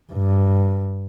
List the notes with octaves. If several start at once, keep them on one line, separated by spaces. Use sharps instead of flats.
G2